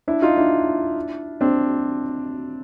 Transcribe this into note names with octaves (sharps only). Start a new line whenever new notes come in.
D4 E4
D#4 F4
D4 E4
C4 D4